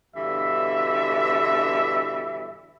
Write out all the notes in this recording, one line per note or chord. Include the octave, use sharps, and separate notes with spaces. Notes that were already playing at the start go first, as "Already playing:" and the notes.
G2 B2 D3 E3 E5